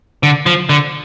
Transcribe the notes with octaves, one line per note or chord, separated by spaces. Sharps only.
D3
F3
D3